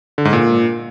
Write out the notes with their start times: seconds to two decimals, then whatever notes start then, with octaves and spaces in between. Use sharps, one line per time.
0.18 D3
0.25 G#2
0.33 A#2